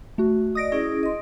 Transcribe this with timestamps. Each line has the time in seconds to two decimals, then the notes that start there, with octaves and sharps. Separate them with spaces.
0.18 A3 F#4
0.55 D5 D#5 D#6 A#6 D7
0.72 C#4 E4 G#4
1.03 D#5 C6